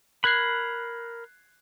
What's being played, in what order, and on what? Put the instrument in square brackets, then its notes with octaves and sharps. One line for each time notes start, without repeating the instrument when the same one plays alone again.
[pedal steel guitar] A#4 B5 [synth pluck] F#6 G#6 C7